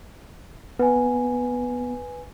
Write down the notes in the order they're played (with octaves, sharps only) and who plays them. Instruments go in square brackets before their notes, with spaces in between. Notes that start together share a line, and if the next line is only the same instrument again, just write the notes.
[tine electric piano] B3 [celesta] B4 G#5